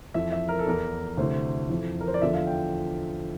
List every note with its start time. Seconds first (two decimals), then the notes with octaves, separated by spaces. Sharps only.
0.14 F2 E3 E5
0.32 E5
0.49 A#4
0.59 A4
0.67 E2 E3 A#4
1.17 D2 C3 E3 C5
1.70 F2 E3
2.00 A#4
2.08 C5
2.14 D5
2.21 E2 D3 F3 E5
2.34 F5
2.47 G5